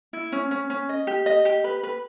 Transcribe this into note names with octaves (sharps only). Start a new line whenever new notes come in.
E4
C#4
C#4
C#4
D#5
G4
D#5
G4
B4
B4